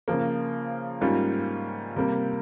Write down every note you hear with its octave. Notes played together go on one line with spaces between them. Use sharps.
C#3 F3 A#3
G#2 G3 A#3 C#4 F4
C3 G3 A#3